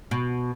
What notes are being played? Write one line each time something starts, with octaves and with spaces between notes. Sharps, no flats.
B2